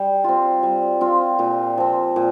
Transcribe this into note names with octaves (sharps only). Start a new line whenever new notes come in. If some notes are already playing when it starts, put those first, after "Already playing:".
Already playing: G3
C4 F4
G3
C4 F4
A#2
F3 C4
A#2